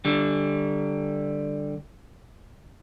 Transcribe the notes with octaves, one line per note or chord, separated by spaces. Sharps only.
D3 G3